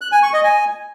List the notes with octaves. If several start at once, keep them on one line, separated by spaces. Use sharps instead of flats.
F#6
G#5
C#6
D#5
G#5